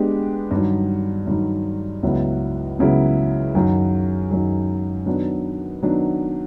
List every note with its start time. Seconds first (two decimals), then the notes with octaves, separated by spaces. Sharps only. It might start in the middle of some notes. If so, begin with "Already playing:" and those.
Already playing: G#3 B3 D4 G4
0.51 G2 D#3 F#3
1.27 G2 D#3 F#3
2.03 C#2 C#3 F#3 B3 E4
2.79 C#2 C#3 F#3 B3 E4
3.55 F#2 D#3 F#3
4.31 F#2 D#3 F#3
5.06 D#3 F#3 B3 D4
5.83 D#3 F#3 B3 D4